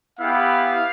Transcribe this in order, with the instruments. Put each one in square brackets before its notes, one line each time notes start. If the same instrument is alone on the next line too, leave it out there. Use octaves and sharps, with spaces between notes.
[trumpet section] B3 E4 G4 F5